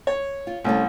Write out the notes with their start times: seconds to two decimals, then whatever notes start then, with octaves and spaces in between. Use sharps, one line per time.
0.07 C#5
0.47 F4
0.64 C2 A3 C#4 A4